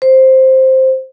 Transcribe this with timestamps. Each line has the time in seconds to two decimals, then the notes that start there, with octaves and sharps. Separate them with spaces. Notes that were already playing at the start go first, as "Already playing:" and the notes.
0.02 C5